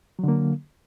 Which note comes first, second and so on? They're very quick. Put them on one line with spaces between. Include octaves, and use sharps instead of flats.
F#3 D3 A#3